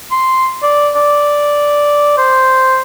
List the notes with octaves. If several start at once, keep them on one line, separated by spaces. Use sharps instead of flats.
C6
D5
D5
C5